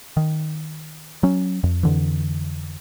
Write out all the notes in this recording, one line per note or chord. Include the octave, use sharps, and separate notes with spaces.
D#3
F#3 C#4
F2
F2 D3 E3